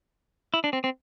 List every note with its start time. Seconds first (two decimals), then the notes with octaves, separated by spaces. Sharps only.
0.54 E4
0.64 D4
0.73 C4
0.84 C4